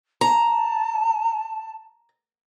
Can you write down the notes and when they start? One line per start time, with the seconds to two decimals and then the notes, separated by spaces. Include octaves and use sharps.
0.21 A5 A#5